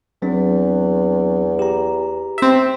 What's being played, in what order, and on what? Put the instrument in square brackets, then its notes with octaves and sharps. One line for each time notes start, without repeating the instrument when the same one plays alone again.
[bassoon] E2 [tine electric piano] F#3 C4 D4
[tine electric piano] G4 A#5
[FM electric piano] C4 E5